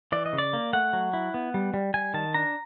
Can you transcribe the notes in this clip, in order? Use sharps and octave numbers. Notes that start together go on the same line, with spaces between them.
E3 D5
D#5
C#3
D5
A#3
A3 F#5
F#3
E4
B3
G3
G3
G3 G#5
D#3 A5
D4 A#5